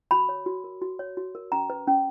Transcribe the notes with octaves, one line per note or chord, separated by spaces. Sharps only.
F#4 B5
C#5
F#4
A#4
F#4
C#5
F#4
A#4
C#4 A#5
B4
C#4